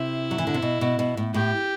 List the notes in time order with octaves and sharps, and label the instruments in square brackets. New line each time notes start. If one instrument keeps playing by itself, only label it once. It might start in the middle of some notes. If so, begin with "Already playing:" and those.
Already playing: [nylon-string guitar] C3 [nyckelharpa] E4
[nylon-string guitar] F#3
E3
D3
C3
B2
B2
B2
A2
[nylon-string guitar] A2 [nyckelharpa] G4